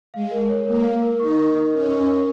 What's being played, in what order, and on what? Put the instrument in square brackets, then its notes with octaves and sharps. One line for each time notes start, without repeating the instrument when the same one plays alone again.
[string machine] G#3 [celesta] F5
[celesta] A#4
C#5
[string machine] A#3 [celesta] A#4
[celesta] F5
A#4
[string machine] D#4 [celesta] C#6
[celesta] A#4
D#5
[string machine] C#4 [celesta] A#4
[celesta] C#6
A#4